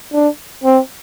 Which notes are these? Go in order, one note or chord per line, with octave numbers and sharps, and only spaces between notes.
D4
C4